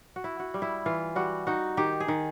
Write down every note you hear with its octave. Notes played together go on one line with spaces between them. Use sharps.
F#4
E4
F#4
G3
E4
E3 F4
G3 F#4
D#4 F#4
D#3 G4
G#4
D#3